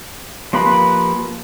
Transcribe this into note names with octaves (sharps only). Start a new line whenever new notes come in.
F3 A#3 G4 B4 B5